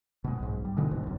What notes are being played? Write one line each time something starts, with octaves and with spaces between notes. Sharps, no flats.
B2 G#3
B1 G#2
G3
B2 D3 E3 G#3
G#1 G#2 B2
C#2 F#2